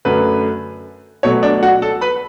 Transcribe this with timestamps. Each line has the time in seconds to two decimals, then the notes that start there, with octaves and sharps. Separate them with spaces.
0.05 F#2 D3 F#3 A3 B4
1.23 B2 F#3 A3 C#5
1.43 D4 D5
1.63 F#4 F#5
1.82 A4 A5
2.01 B4 B5